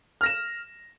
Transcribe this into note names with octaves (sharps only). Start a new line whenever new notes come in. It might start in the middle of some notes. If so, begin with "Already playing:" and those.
F6 A#6 E7